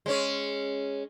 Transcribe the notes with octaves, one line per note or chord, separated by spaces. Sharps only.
G#3 C#4 C#5